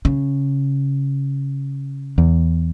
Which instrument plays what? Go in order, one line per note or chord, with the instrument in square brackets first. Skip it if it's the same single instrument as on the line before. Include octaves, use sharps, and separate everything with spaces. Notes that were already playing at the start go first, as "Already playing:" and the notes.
[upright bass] C#3
[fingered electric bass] E2